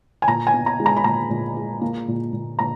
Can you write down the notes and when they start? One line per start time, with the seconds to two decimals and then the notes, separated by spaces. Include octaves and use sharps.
0.22 G#5
0.28 A#2 A#5
0.47 G#5
0.54 B3
0.66 A#5
0.80 G#3
0.86 A#5
0.97 B5
1.04 A#2 A#5
1.30 A#2
1.56 G#3
1.81 A#3
2.08 A#2
2.33 A#2
2.59 A#2 A#5